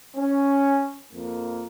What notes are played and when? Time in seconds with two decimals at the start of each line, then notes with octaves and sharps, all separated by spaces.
0.16 C#4
1.13 F2 A#3